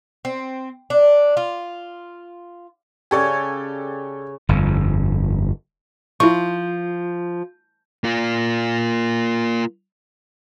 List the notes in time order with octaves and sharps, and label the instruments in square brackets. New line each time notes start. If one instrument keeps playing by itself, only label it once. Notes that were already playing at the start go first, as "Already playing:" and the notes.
[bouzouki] C4
D4
F4
[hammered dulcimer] C#3 C#5 G#5 [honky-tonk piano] G4 A4 D5
[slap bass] G1 F2
[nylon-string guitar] F3 [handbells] E4 C#6
[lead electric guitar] A#3 F4